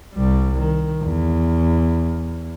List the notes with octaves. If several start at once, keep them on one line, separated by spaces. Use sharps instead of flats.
C2 G3
D#3
E2